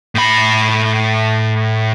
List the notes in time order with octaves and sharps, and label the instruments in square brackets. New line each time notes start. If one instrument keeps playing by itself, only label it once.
[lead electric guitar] A2 B5